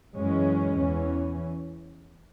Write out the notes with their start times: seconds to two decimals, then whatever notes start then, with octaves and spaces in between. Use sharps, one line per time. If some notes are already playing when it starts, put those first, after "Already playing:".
0.16 F#2 E3 G#3 C#4
0.77 E2 E3 C#4